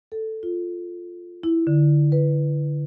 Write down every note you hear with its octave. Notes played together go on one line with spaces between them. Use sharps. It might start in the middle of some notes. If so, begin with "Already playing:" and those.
A4
F4
E4
D3
B4